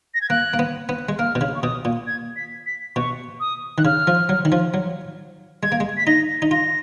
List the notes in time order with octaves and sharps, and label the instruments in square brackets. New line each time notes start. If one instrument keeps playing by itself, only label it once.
[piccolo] A#6
G#6
[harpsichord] A#3 [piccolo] F#6
[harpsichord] A#3
B3
B3
G#3
[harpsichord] A#3 [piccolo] F6
[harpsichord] B2
C#3
[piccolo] C#6
[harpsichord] B2 [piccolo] D#6
[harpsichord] A#2
[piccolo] G#6
B6
B6
[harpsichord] B2 [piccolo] C#6
[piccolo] D#6
[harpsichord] D#3 [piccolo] F#6
[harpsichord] C#3 [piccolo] F6
[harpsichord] F3
F#3
D#3
F3
F#3
[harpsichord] G#3 [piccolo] G#6
[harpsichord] A#3
G#3
[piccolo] B6
[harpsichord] D#4 [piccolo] A#6
[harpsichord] D#4
[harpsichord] F4 [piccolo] A#6